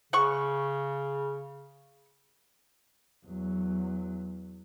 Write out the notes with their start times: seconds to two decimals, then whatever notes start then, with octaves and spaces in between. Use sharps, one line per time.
0.13 C#3 F#5 C#6
3.25 E2 F#3